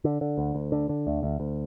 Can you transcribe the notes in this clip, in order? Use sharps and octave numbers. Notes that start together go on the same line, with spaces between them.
D3
D3
D2
D2
D3
D3
D2
D2
D2